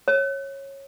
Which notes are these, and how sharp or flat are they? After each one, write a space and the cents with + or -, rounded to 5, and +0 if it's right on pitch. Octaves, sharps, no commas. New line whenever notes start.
C#5 -15